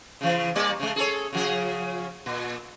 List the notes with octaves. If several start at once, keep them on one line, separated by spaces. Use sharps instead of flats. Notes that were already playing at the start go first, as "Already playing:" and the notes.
C#3 E3
G3 A#3 D5
C#3 G#3
G#4 A4 C#5
C#3 F3 G#4
A#2